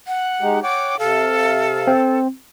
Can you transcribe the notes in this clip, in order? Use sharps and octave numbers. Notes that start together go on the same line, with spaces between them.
F#5
G#3 D#4 G4
C#5 F#5 G5 D6
C3 A4 F5
C4